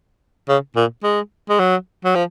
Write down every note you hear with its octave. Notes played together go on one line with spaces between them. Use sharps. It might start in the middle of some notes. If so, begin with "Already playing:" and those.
C#3
A#2
G#3
G#3
F#3
F#3
F3